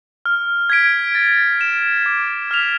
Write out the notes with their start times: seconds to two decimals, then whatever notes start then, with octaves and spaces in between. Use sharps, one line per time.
0.25 F6
0.70 G#6 B6 D7
1.15 A6
1.61 E7
2.06 D6
2.51 F6 B6 F7